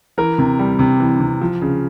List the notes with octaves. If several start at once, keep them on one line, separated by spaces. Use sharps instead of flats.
E3 A#4
C3
G3
C3
E3
C3
F3
C#3